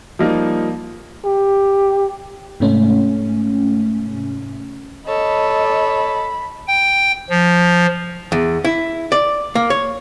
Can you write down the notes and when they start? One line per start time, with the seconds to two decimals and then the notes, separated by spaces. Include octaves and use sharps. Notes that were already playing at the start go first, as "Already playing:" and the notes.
0.19 F3 G3 A#3 D#4
1.25 G4
2.60 G#2 C3 A3 C#4
5.08 A4 C#5 D#5 B5
6.68 G5
7.30 F3
8.32 E2
8.65 E4
9.12 D5
9.55 A#3
9.70 C#5